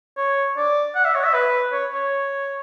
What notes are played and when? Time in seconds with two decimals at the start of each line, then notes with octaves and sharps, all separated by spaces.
0.17 C#5
0.57 D5
0.95 F#5
1.05 E5
1.15 C#5
1.24 E5
1.34 B4
1.72 C#5
1.92 C#5